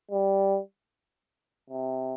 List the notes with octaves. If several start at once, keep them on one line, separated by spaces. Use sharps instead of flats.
G3
C3